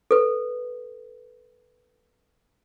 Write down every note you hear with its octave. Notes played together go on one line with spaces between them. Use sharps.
A4 B4